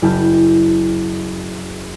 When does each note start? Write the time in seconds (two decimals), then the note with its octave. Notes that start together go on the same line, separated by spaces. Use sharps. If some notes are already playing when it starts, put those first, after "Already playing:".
0.02 F#1 E4 G5 A5 F6 G6